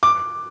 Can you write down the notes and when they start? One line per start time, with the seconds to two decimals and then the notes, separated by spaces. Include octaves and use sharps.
0.03 D6